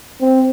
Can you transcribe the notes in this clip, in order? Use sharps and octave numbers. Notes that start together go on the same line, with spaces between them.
C4